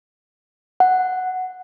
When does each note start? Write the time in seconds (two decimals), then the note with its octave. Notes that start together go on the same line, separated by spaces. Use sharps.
0.80 F#5